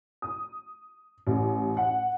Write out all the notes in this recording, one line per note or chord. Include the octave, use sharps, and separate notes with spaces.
D#6
A1
F#5